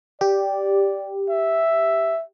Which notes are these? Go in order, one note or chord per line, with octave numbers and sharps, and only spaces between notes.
G4 D5
E5